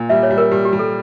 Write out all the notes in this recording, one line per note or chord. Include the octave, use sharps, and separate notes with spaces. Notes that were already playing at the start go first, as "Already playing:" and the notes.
Already playing: A#2
G3 E5
C#5
G3
A#4
G3 G4
G4
G3
A4